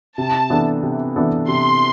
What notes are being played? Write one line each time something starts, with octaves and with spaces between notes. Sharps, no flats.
C3 A5
E3 B3 D4 A4
C3
E3 B3 D4 A4
C3 C6